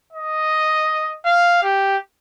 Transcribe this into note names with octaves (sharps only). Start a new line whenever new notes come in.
D#5
F5
G4